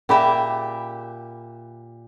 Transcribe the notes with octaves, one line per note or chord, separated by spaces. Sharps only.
A#2 C#4 G4 G#4 E5 B5